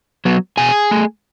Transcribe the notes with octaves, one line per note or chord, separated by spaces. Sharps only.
F#3 B3
B2 G#4 G#5
A3